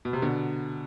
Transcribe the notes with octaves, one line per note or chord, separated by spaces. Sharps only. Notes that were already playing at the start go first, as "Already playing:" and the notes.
B2
C3
B2 D3